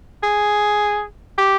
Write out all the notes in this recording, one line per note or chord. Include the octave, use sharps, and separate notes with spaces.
G#4
G4